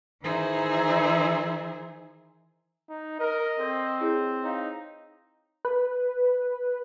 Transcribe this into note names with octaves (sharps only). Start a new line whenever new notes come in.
D#3 E3 D#4 E4 G#4 C5
D#4
A#4 D#5
C4 A4 D5
E4 G#4 C#5
D#4 C#5 F5
B4